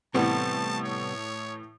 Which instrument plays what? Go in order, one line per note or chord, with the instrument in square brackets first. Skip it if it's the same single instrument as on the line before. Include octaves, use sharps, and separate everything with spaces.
[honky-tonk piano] A2 E3 [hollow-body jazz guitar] C3 G3 B3 [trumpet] A5
[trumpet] C#5